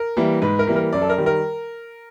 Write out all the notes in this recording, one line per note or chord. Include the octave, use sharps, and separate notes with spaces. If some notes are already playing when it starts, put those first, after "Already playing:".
Already playing: A#4
E3 G3 A#3
G#2 B4
A#4
E3 G3 A#3
A#4
F#2 D5
A4
A#4
D#3 G3
A#4